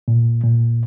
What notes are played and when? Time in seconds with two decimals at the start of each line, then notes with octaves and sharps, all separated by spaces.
0.08 A#2
0.44 A#2